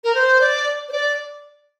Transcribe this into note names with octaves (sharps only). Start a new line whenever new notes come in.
A#4
C5
D5
C5
D5